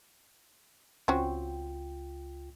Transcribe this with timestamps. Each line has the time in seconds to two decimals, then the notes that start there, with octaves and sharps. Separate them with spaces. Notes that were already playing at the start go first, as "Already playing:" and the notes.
1.08 C#2 C4 C#4 F4 F#4 G5